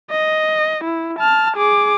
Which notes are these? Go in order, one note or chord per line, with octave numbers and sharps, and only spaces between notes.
D#5
E4
A5 F6
G#4 D6